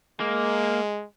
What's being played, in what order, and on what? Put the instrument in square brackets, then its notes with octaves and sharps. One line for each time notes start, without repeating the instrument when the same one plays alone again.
[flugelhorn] G#3 [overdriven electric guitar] A#3